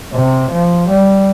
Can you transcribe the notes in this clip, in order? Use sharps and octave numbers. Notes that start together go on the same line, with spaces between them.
C3
F3
G3